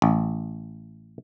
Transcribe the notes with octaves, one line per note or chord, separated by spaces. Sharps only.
A1